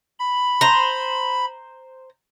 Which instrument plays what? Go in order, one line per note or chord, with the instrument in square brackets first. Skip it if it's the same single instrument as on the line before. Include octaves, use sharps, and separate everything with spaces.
[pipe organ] B5
[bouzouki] C5 A#5